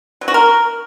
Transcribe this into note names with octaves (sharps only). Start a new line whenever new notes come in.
F#3
F#4
A#4